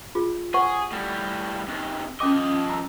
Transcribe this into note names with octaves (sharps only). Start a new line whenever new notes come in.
F4 G#4
G#4 C5 F#5 C#6
A2 G3
C3 D#3
F3 C#4 D#5 G5 D6
A#5 E6